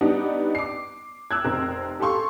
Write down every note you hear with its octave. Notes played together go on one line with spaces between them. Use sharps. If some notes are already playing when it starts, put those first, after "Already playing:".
G3 B3 D4 D#4
D6 C7
D6 E6 F#6 G#6
F1 C4 A#4
G4 A4 F5 C6 C#6